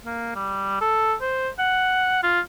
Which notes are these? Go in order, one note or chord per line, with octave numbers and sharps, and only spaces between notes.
A#3
G3
A4
C5
F#5
F4